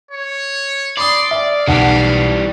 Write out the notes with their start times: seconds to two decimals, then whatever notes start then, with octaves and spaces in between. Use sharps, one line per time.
0.11 C#5
0.98 D5 B5 C6 D#6
1.31 E5 F5
1.68 B1 E3 G3 F#5 A5